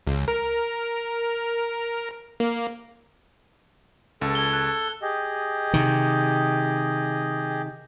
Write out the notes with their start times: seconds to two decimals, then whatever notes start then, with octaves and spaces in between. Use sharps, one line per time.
0.07 C#2
0.28 A#4
2.40 A#3
4.21 C#2 A4
4.35 G#6 G7
4.53 F#6 G#6
5.02 G4 G#4 D#5
5.74 C3 D#3